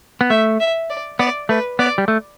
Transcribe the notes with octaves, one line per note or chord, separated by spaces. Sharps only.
B3
A3 E5
E5
D5
B3 D5
A3 B4
B3 D5
G3
A3